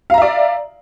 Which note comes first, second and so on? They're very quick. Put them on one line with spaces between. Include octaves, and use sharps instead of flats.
F5 A#5 E5 D5